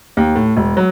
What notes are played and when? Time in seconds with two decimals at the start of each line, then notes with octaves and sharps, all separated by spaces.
0.17 D#2
0.36 A2
0.57 E1
0.77 F#3